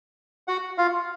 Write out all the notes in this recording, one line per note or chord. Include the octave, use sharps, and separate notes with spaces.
F#4 F#5
F4 F5